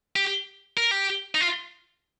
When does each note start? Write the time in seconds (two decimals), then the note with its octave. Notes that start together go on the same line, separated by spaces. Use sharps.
0.16 G4
0.77 A#4
0.91 G4
1.35 D#4
1.41 F4